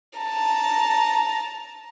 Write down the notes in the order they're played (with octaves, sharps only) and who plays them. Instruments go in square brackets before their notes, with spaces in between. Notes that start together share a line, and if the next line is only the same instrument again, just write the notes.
[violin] A5 A#5